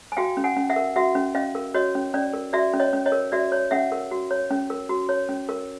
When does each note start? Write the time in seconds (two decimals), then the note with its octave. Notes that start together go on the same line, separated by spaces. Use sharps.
0.12 G#5
0.17 F#4 F5 G5
0.37 C#4
0.44 F#5 G#5
0.56 C#4
0.70 E5 F#5
0.76 A#4
0.96 F#4 E5 F#5
1.15 C#4
1.35 C#4 D#5 F5
1.55 A#4
1.74 F#4 C#5 D#5
1.95 C#4
2.14 C#4 D5
2.33 A#4
2.53 F#4 D5 E5
2.73 C#4
2.80 C#5 D#5
2.93 C#4
3.06 C#5 D#5
3.12 A#4
3.32 F#4 D5 E5
3.52 C#5
3.71 C#4 E5 F#5
3.92 A#4
4.11 F#4
4.31 C#5
4.51 C#4
4.70 A#4
4.89 F#4
5.09 C#5
5.29 C#4
5.49 A#4